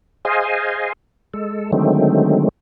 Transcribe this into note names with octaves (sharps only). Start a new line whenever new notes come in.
G#4 C5 D#5 F5 G#5
G#3 A4
D3 D#3 F#3 G#3 A3 C4